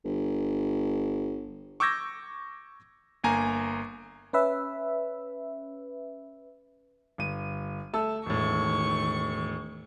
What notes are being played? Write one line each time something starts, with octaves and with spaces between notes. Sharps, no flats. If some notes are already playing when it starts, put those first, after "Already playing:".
G1
C#6 D6 E6 G6 G#6 A#6
G1 A#3 G#5 A#5
C#4 B4 E5
G1 D#7
A3 A5 E6
E1 A2 D#3 C#6